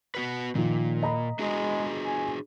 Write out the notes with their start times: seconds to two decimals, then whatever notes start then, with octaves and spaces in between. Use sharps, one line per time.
0.15 B3 F#4 B4
0.55 A#2 D#3 F3
1.02 D#5 A#5 B5
1.39 G#3 D4 F#4 G#4
2.05 G#5